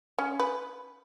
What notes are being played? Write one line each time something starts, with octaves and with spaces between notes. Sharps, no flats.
C#4
B4